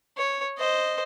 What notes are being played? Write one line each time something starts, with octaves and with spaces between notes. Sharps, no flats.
C#5
C5 D#5